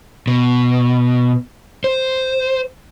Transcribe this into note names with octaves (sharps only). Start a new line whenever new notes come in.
B2
C5